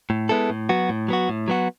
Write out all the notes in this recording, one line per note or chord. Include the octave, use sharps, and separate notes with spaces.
A2
G#3 B3 E4 A4
A2
F#3 B3 F#4
A2
F#3 B3 F#4
A2
F#3 B3 F#4